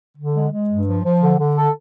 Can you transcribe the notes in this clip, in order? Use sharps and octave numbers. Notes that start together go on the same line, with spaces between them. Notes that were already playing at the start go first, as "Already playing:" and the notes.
D3
G#3
G#3
G2
F3
F3
D3
D3
A4